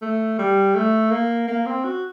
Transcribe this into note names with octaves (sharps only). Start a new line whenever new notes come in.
A3
G3
A3
A#3
A#3
C4
F#4